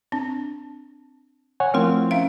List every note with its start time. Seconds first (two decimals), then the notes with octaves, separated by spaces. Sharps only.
0.12 C4 D4
1.60 C#5 F#5 G#5
1.74 F3 A3 C4 E4 A#4 C5
2.11 C#4 E5 F5